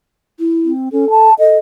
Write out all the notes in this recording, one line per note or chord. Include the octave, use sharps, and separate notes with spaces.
E4
C4
C#4 A4
A5
A4 D#5